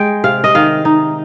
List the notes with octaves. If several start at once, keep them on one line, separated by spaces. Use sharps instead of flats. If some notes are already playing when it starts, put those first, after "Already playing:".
Already playing: G#3 G5
C3 F5
D#5
D#3 F5
D#4